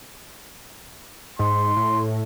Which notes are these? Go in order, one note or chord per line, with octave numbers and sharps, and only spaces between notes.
G#2 C6
A2